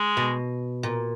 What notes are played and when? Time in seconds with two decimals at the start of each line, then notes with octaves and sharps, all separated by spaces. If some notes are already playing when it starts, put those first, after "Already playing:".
Already playing: G#3
0.17 B2
0.83 A#2